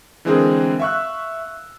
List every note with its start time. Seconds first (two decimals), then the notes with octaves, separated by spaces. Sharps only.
0.25 D3 E3 G#3 C4 G#4 A#4
0.80 E5 F5 C#6 E6 F#6